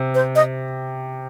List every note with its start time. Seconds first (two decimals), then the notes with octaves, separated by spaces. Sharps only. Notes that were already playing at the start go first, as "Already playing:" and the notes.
Already playing: C3
0.15 C5
0.36 D#5